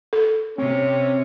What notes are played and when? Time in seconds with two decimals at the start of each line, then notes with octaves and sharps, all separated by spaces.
0.13 A4
0.58 C3 C4 C#4